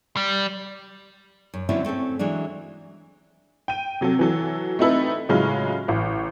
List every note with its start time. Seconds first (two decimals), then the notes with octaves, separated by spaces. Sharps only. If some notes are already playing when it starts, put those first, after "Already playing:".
0.17 G3
1.54 F#2
1.69 D3 F3 F#3 C4 C#4 E4
1.84 A3 C4 C#4 A4
2.19 E3 F#3 G#3 D4
3.68 G5 D#7
4.01 C3 F#3 C4 A4
4.19 E3 F#3 A4
4.79 A3 C4 D#4 E4 A4 B4
5.29 A2 C#3 F#3 G#3 C#4 F4
5.88 A1